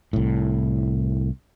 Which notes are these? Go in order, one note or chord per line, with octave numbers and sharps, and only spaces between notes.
C2 A2